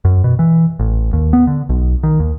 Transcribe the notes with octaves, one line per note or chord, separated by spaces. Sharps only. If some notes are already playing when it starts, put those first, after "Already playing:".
F#2
B2
E3
A1
D#2
B3
D3
B1
D#3
D#2